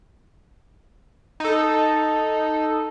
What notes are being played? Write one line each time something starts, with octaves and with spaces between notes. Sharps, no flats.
D#4 A4